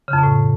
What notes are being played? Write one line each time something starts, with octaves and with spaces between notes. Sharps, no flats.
C#3
F2
B2
A2